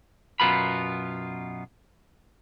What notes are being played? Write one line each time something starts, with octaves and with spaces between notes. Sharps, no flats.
F#2 B2 B3 F4 A#4 B5